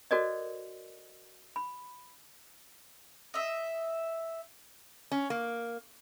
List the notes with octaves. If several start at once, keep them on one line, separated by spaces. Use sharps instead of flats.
F#4 A4 A#4 C5 D5 D#5
B5
D#5 E5
C#4
A#3